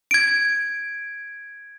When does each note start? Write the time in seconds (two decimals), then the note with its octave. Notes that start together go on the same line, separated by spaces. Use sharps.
0.11 G#6 D7